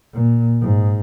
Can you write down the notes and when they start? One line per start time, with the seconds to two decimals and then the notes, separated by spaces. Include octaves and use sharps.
0.13 A#2
0.61 G#2